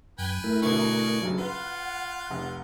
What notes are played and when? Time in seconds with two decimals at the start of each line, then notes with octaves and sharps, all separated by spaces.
0.19 F#2 B4 G5 G#5
0.44 A3 E4 A#4
0.62 B2 D3 D5 G#5 C#6
1.22 F#1 G2 F#3 G3
1.38 F4 B4 F#5
2.30 F1